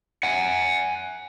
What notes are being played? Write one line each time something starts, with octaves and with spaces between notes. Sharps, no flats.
F#5 G#5